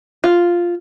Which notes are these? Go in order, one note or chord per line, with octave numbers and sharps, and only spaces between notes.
F4